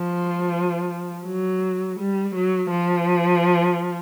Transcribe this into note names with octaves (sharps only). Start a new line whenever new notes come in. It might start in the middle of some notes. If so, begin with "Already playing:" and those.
Already playing: F3
F#3
G3
F#3
F3